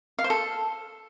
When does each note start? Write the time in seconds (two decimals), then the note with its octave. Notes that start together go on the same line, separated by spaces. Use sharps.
0.19 F5
0.24 C5
0.30 A4